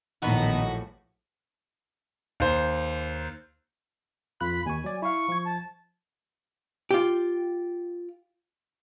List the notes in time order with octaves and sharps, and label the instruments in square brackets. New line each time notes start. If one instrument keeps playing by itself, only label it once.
[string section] A#1 A2 E3 [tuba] D#3 [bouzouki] B3 D#4 [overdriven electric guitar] F#4
[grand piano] D#2 C5
[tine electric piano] F2 F4 F#6 [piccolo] B5
[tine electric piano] D#2 C#6 [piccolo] G#5
[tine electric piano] F#3 D5
[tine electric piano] E4 F5 [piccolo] C#6
[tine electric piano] F3 G#6
[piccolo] A5
[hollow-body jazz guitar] F4 G4